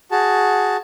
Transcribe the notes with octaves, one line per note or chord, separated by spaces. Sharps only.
F#4 G#4 A5